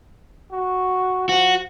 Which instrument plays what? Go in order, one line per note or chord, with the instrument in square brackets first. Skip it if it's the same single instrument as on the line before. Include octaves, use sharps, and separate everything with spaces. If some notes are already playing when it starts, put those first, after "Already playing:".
[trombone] F#4
[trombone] F3 [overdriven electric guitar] F#4